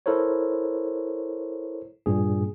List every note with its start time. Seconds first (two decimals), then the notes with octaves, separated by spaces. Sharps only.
0.06 E4 A4 A#4 C5 C#5
2.06 G2 A#2 G#4